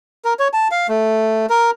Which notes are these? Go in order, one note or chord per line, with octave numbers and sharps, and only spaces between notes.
A#4
C#5
A5
F5
A3
A#4